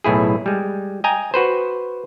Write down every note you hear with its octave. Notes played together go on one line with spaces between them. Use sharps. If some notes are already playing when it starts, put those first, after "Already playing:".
B1 A2 E4 G#4
G3 G#3
D#5 G5 G#5 A#5
F#4 B4 C5